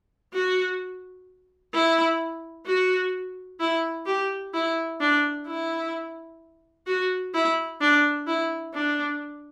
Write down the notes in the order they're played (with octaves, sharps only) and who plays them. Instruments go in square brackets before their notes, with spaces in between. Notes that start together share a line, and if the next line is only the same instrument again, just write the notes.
[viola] F#4
E4
F#4
E4
G4
E4
D4
E4
F#4
E4
D4
E4
D4